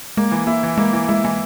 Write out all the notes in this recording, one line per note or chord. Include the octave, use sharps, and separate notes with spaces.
G#3 A#3
E3
A#3 E4
E3
G#3 A#3
E3
G#3 E4
E3 G#3